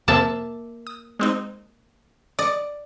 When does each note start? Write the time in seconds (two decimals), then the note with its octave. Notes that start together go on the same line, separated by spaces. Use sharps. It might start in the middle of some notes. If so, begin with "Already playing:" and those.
0.08 F2 C3 A#3 C4 E5 A5
0.87 D#6
1.19 G#3 C4 D#4
2.39 D5 D#5 C#7